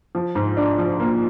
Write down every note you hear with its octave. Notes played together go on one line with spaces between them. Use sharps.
F3
G#2
D4
F3
A#3